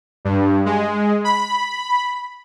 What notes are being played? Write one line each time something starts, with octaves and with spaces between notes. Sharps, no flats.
G2
G#3
B5